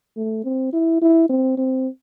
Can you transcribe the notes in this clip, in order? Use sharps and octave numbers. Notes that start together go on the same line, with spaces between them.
A3
C4
E4
E4
C4
C4